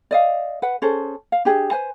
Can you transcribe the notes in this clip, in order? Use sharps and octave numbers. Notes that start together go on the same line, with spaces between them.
D5 D#5 F5
B4 F#5
C#4 G#4 A4 C5
F5
D4 G4 G#4
B4 C5 G#5